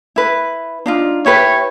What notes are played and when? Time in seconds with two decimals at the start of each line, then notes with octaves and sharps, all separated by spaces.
0.16 E4 B4
0.86 D4 D#4 F4
1.26 E4 G4 B4 C#5